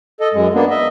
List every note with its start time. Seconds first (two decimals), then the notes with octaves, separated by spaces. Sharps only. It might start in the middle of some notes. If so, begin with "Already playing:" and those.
0.20 A4 D#5
0.33 F#2 G#3
0.54 A#3 B3 D4
0.70 D#5 E5